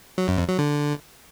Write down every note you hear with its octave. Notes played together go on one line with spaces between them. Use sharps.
F#3
F#2
F2
F#3
D3